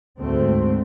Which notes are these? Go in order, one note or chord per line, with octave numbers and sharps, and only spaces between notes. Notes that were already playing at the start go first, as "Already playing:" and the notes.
D2 G#2 A3 C4